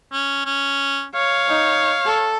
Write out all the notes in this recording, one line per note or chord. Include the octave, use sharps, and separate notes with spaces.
C#4
C#4
C#5 F5
D#4
A4